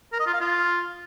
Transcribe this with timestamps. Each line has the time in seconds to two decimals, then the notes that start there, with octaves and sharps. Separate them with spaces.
0.13 A#4
0.20 D#5
0.27 F4
0.34 F5
0.41 F4